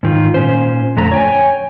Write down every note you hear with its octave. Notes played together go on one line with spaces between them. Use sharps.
G#2 D#3 F4
A#2 C#4 C5
F2 D3 A3 A#5
C#5 G5 G#5